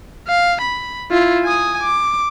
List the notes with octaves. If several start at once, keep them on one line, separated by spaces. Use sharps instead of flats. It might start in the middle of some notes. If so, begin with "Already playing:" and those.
F5
B5
E4 F4
G#5 D#6
D6